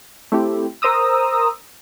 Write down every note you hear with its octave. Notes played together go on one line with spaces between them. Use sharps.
A3 C4 E4 G4
A#4 C5 A#5 D#6 E6